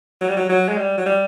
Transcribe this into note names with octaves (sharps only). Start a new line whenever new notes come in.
F#3
G3
F#3
F#3
G#3
G3
F#3
G3